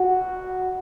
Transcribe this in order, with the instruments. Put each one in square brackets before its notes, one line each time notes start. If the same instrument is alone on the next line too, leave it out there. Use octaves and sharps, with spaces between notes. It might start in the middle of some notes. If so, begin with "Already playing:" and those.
Already playing: [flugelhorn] F#4